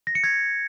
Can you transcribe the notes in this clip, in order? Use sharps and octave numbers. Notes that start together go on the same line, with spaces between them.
A#6
C#7
G#6